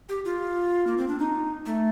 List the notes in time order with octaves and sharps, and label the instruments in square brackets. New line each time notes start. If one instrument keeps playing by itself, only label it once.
[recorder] G4
F4
A#3
C4
D4
D#4
A3